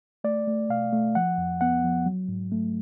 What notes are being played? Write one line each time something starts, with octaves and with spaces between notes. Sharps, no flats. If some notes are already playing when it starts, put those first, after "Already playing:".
A3 D5
A3
B2 F5
A3
F3 F#5
F2
B3 F#5
F3
F#3
G#2
A3